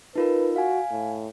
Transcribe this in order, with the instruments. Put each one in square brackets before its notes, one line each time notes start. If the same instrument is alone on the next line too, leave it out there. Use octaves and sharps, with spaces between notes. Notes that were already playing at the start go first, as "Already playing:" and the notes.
[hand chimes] D#4 F4 A#4 [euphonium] B4
[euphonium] F#4 [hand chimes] F5 G#5
[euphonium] A2